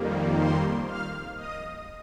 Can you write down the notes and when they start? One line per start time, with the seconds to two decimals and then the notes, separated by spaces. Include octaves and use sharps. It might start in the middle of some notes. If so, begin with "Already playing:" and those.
Already playing: F2 D#3 G3 A#3
0.35 C5 C6
0.85 F5 F6
1.36 D#5 D#6